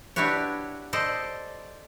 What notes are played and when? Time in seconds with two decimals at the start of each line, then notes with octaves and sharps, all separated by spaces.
0.16 D4 E4 F#4 G4 B4 C#5
0.93 A4 C5 D5 D#5